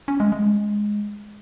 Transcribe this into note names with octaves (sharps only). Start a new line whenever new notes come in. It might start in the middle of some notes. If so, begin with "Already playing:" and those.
C#4
G#3
G#3